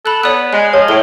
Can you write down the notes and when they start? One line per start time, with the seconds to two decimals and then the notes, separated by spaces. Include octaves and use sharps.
0.06 A4 B5 F#6
0.23 B3 C#5 D5 F#6
0.53 G#3 F#6
0.73 F3 C#5
0.88 A2 G7